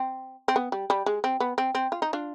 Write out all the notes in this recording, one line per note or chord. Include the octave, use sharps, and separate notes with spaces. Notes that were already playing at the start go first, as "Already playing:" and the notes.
Already playing: C4
C4
B3
G3
G3
G#3
C4
B3
C4
C4
F4
D#4
D4 F4